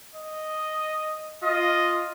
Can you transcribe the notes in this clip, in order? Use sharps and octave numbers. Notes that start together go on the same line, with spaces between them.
D#5
F4 D#5